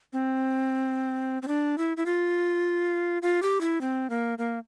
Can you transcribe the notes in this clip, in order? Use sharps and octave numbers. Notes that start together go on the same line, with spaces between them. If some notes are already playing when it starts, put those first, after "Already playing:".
C4
C4
D4
E4
E4
F4
F4
G4
E4
C4
A#3
A#3